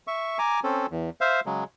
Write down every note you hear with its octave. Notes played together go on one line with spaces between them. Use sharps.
E5 C#6
G#5 A#5 D6
C4 C#4 A4
E2
C5 E5 F5
C#3 F#3 G#3